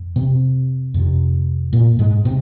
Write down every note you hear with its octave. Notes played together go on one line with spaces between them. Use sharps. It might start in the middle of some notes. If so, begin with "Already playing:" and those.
Already playing: F2
C3 C4
F2 C3
A#2 A#3
G#2 G#3
C3 C4